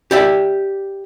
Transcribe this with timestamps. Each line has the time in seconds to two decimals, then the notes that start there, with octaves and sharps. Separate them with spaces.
0.11 G4 D5 E5